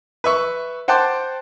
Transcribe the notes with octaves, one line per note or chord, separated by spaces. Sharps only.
B4 E5 C#6
C5 F#5 G5 A5 C6 D6